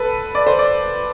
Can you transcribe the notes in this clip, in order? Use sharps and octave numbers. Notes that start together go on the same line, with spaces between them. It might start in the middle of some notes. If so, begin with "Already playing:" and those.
Already playing: A4 B4
D5
C5
D5